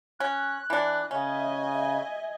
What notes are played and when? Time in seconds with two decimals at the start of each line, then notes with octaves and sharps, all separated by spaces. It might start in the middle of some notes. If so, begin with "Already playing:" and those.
0.20 C#4 F#6
0.70 E3 D4
1.11 C#3 C#4 D#5 E5 G#5
1.73 E5